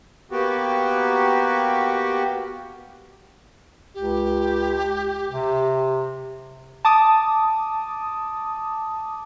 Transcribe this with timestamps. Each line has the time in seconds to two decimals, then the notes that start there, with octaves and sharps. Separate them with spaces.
0.31 A#3 B3 F#4 G4
3.95 C#2 G4
5.30 C3
6.85 A5 D6 D#6